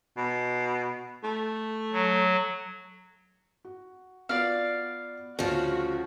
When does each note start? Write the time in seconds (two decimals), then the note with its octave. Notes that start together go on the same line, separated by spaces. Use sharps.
0.17 B2
1.24 A3
1.93 F#3
3.65 F#4
4.29 B3 F4 F#4 D5 F5
5.39 D2 C#3 F3 F#4